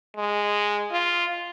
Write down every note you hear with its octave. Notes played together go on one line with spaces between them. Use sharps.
G#3
F4